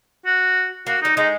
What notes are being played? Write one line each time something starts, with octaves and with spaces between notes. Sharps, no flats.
F#4
A#3 F#4
G3 D#4
G#3 D#4